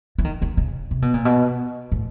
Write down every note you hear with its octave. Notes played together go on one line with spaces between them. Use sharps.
E3
D#3
D#3
C#3
C3
B2
A#2
B2
A2